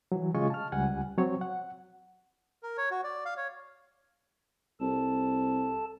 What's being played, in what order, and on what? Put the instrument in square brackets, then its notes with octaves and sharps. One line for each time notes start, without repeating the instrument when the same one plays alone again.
[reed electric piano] E3 F#3
C#3 G#3 F4 D#5 G#5 C#6
A5 F6
C#2 G3 F#5 G#5
F#3 C4 C#5
F#5
[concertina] A#4
C#5
F#4
D5
F5
C#5
[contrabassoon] C2 [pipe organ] A4 A5